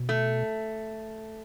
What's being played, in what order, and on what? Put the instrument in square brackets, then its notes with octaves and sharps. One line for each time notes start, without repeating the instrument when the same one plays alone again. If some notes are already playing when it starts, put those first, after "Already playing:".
Already playing: [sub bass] B2
[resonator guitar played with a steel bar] A3